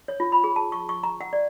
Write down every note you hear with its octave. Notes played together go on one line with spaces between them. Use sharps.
C#5
F4
B5
G#4
A5
C#6
C#6
A#5
F#5
D5